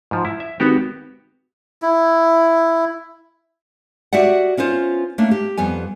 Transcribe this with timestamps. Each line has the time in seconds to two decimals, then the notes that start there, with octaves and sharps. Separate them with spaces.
0.11 G#2 F3
0.25 E4
0.40 E5
0.60 G#1 B3 F#4 G4
1.82 E4
4.13 F#4 G4 D5 E5 F#5
4.57 B3 C#4 F4 C5
5.18 A3 A#3 C#4 D4
5.31 G4
5.57 F2 G3 B3 G#5